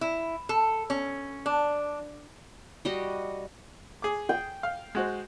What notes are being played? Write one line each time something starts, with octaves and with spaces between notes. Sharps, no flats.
E4
A4
C#4
D4
G3 F#4 D#5
G#4 D6
G5
F5
G#3 F#4 C5